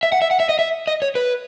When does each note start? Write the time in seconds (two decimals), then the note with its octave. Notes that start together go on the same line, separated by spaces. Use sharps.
0.03 E5
0.12 F#5
0.22 E5
0.31 F#5
0.40 E5
0.49 D#5
0.59 E5
0.87 D#5
1.02 C#5
1.15 B4